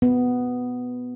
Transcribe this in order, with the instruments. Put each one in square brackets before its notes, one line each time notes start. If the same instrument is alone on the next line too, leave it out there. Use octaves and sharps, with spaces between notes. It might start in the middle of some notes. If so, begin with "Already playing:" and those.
[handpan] B3